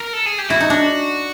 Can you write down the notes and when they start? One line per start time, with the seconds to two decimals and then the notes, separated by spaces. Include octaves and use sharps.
0.00 A#4
0.13 A4
0.26 G#4
0.38 G4
0.50 E4 F#4
0.60 D#4
0.70 D4